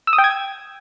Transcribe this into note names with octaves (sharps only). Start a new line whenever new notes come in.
E6
D#6
G5
G#6